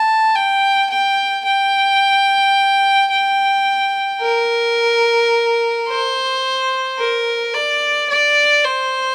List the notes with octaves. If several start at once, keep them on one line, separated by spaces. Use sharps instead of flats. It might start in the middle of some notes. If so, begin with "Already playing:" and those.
Already playing: A5
G5
G5
G5
G5
A#4
C5
A#4
D5
D5
C5